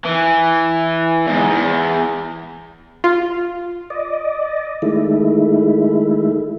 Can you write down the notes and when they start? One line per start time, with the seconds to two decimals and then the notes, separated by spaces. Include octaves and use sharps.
0.05 E3
1.27 E2 G#2
1.50 E2
3.04 F4
3.90 D5 D#5
4.82 D#3 G#3 A3 E4